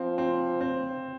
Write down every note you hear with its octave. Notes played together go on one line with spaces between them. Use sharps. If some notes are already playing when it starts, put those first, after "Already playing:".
Already playing: F3 C4
C4
C4